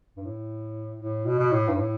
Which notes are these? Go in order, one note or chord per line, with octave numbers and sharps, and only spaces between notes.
G2
A2
A2
B2
B2
A2
G2
A2